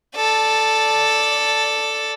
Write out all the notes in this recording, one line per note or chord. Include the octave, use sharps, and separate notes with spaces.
A4 D5